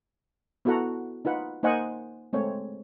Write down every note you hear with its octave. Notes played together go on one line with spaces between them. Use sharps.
B3 E4 F#4 A4 F#5 A#5
D#4 F4 B4 F#5
A#3 D#4 C5 D#5 F#5 G#5
G#3 A3 C4 C#5